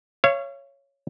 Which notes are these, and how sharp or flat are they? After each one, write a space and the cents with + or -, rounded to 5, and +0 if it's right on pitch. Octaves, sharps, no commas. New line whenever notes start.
C#5 +0 F5 -40